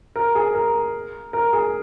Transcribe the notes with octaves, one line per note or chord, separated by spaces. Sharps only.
A#4
G#4
A#4
A#4
G#4